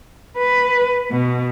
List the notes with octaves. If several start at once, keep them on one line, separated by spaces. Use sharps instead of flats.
B4
B2